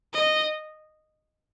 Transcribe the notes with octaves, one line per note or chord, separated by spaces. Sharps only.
D#5